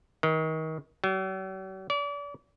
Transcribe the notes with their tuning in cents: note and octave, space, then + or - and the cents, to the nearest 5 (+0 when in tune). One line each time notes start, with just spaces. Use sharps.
D#3 +30
F#3 +45
D5 -35